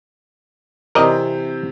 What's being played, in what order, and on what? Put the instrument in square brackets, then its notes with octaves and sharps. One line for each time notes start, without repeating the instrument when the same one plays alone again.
[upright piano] C3 E3 C4 [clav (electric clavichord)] A#4 D5 D#5